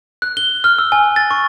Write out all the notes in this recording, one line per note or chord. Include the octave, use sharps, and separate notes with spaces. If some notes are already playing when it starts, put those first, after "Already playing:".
F#6
G7
F6
E6
G#5
A6
C#6